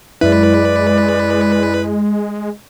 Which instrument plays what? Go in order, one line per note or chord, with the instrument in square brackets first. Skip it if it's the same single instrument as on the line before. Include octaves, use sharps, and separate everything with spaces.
[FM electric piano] F#2 E4 [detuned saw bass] G#3 [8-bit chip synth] B4 [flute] D5